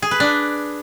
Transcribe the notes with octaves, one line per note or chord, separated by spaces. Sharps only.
G#4
B4
D4